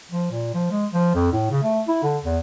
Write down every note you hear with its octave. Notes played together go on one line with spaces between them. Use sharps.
F3
A#2
F3
G#3
F3
F2
A2
C#3
A3
E4
D3
E2